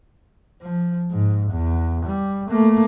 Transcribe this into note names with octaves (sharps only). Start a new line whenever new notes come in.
F3
G#2
E2
G3
A3 A#3